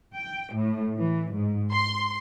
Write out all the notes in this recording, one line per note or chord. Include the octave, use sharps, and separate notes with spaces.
G5
A2
E3
G#2
C6